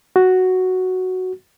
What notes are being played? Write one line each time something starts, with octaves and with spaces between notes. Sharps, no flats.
F#4